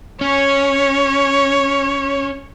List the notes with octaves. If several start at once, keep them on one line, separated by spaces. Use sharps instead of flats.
C#4 C#5